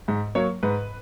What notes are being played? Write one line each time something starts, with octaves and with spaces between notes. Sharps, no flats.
G#2
F#3 A#3 C#5
G#2 B4